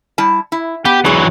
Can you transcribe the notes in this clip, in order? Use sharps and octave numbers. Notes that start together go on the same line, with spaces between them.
G3 E4 A5
E4
B3 G4
E3 F#3 D4 G#4